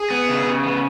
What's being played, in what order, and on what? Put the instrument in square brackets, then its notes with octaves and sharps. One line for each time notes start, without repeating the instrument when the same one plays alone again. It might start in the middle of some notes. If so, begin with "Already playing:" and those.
Already playing: [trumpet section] G#4
[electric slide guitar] B3
C#3
C#3
B3